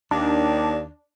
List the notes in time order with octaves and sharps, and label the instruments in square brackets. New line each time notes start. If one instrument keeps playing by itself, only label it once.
[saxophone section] D#2 [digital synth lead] D4